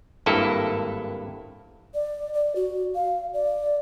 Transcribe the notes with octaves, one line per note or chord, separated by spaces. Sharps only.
G#1 G2 A#3 E4 A4
D5
D5
F#4
F5
D5